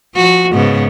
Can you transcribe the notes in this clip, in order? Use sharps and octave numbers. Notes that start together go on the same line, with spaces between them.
F3 F#4
G#2 C#3 B3